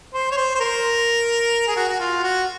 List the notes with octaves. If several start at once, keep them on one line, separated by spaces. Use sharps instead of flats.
C5
C#5
C5
C5
A#4
G#4
F#4
F#4
F4
F#4